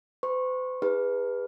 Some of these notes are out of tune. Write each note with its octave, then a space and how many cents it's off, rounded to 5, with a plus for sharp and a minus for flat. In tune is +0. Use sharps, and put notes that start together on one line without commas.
C5 -45 C#6 -25
D#4 +45 G#4 -35 B4 +0